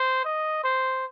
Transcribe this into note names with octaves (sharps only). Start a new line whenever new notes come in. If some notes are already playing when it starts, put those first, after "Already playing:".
Already playing: C5
D#5
C5